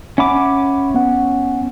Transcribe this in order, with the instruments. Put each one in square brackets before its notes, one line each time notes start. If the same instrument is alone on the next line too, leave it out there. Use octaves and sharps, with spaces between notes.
[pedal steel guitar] C#4 D6 [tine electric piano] E5 F#5 B5
[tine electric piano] B3 F#5